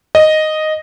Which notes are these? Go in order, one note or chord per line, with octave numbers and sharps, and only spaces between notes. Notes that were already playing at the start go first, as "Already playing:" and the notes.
D#5